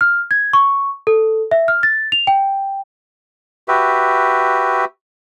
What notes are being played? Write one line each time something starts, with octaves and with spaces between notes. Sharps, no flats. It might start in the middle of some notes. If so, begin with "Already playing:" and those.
F6
G#6
C#6
A4
E5
F6
A6
F7
G5
F#4 G4 B4 E5